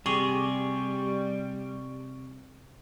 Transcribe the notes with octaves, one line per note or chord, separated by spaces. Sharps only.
C3 G3 G4 G#4 C#6 G7